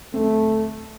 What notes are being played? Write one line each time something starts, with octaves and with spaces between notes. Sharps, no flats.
D1 A3 C4